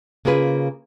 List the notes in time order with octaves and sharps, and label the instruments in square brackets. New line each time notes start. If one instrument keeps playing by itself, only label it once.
[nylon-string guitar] C#3 A#3 F4 G#4 B4